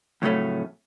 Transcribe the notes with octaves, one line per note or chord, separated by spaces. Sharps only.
F2 A2 C#3 F#3 A3 C#4